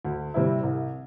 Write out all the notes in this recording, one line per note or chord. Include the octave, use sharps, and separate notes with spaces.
D2
C3 G3 C4 E4
C2